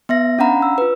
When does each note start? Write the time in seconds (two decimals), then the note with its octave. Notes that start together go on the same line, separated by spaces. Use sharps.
0.09 B3 E5 A#6
0.39 C#4 D4 F5 F#5 A#5 B5
0.62 E6
0.78 F4 B4